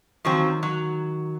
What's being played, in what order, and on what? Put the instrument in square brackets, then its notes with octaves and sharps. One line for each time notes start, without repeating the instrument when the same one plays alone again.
[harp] D#3 [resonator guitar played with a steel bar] F3 F#3 C4
[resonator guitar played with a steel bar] F#3